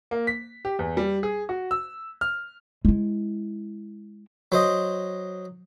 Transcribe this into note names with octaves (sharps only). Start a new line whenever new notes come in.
A#3
B6
G4
E2
G3
G#4
F#4
E6
F6
G#3 E4
F#3 C5 D#5